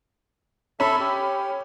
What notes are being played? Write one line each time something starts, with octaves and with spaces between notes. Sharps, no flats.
C#4 A4 E5 B5
G4